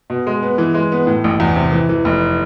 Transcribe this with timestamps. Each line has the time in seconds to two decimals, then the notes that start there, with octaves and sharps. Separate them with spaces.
0.10 B2
0.27 G#3
0.43 B3
0.58 E3
0.74 G#3
0.92 B3
1.07 A2
1.24 A1
1.40 E2
1.56 C3
1.72 E3
1.89 E3
2.05 F1